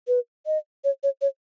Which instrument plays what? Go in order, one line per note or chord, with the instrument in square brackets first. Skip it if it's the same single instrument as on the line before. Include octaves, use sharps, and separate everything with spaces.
[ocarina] B4
D#5
C#5
C#5
C#5